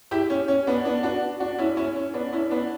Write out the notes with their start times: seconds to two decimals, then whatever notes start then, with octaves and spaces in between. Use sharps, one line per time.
0.11 E4 G4
0.30 C#4
0.48 C#4
0.67 B3 D4
0.85 B3 D4
1.03 D4 F#4
1.40 D4 F#4
1.58 C#4 E4
1.77 C#4 E4
1.95 C#4
2.14 B3 D4
2.33 C#4 E4
2.50 B3 D4